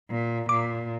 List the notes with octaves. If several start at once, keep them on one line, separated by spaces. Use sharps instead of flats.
A#2
A#2 D6